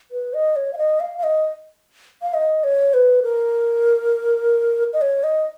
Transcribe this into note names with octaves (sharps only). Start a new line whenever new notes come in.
B4
D#5
C#5
F5
D#5
F5
F5
D#5
F5
D#5
C#5
B4
A#4
D#5
C#5
D#5